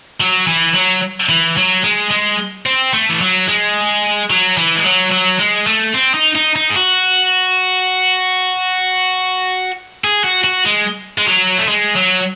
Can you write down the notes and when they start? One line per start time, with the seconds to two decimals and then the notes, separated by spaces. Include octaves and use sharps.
0.20 F#3
0.47 E3
0.75 F#3
1.29 E3
1.57 F#3
1.84 G#3
2.11 G#3
2.66 C4
2.93 A3
3.09 E3
3.21 F#3
3.48 G#3
4.30 F#3
4.57 E3
4.77 G#3
4.84 F#3
5.12 F#3
5.39 G#3
5.67 A3
5.94 C4
6.14 D#4
6.35 D#4
6.56 D#4
6.70 G#4
6.76 F#4
10.04 G#4
10.24 F#4
10.44 F#4
10.66 G#3
11.18 G#3
11.27 F#3
11.58 A3
11.68 G#3
11.95 F#3